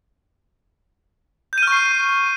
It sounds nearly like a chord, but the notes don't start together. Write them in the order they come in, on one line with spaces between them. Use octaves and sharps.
G6 D#7 F6 C#6 C7